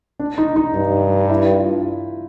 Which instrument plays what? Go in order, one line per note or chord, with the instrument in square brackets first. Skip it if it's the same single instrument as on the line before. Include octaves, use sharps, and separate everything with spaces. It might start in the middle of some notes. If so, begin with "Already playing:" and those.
[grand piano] D4
D#4
D#4
[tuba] G2
[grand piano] E4
F4